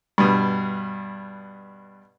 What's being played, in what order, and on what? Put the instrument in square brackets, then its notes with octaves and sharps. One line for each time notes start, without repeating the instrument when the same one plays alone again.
[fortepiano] G2 B2